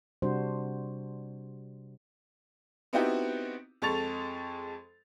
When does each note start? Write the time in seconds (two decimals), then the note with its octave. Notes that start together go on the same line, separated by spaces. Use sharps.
0.22 C3 G3 D4 F#4 C5
2.93 B3 C4 D#4 E4 F#4 G4
3.82 F2 G#3 A4 C#6 A6 F7